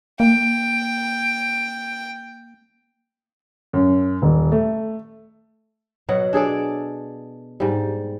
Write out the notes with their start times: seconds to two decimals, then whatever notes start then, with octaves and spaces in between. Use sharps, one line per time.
0.20 A#3 G5
3.73 F#2
4.22 D#1
4.52 A3
6.09 B2 F#3 F#5
6.33 D4 G#4 A4 D5
7.60 G#2 G3